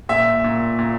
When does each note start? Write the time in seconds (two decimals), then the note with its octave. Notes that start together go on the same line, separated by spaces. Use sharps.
0.09 A#2 E5
0.44 A#2
0.79 A#2